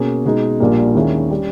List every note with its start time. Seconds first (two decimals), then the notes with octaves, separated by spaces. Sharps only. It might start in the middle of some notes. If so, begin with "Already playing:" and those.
Already playing: B2 A#3 C#4 G#4
0.25 B2 G#3 D#4
0.60 A#1 A#2 G3 A#3
0.95 D#2 D#3 G#3 C#4 E4
1.31 G3 C#4